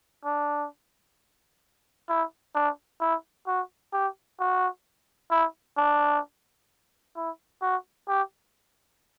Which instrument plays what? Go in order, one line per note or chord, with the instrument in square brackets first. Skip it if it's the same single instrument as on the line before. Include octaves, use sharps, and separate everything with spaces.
[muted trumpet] D4
E4
D4
E4
F#4
G4
F#4
E4
D4
E4
F#4
G4